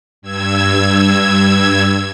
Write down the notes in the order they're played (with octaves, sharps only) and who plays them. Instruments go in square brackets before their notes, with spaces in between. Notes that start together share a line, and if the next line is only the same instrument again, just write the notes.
[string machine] G2 E6 G#6